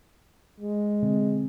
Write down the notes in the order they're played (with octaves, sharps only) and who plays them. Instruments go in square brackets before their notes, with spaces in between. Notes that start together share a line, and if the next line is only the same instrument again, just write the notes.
[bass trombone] G#3
[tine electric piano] B2 D3 C4